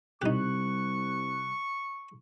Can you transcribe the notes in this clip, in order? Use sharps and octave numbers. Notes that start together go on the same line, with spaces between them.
C2 C3 G3 D#4 G4 C#6 F#6